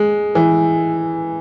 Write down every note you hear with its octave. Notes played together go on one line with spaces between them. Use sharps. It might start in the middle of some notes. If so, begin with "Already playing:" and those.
Already playing: G#3
E3